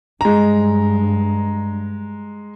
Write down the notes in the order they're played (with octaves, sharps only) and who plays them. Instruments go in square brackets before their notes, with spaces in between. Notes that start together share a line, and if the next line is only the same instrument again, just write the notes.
[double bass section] G2 [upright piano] G#3 A#5